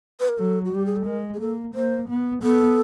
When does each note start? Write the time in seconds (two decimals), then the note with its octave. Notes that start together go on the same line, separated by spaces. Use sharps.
0.20 B4
0.29 A#4
0.38 F#3 A4
0.65 F#4
0.73 G3 G4
0.86 G#4
0.96 A4
1.06 G#3 A#4
1.34 G#4
1.40 A#3 A4
1.75 A#3 C5
2.09 B3
2.43 B3 A4